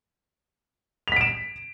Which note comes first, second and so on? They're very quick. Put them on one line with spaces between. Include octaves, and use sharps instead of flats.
F7 B6 D7 E7